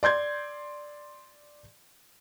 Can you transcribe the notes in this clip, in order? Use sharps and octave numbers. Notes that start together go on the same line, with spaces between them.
D5 C6 G6 G#6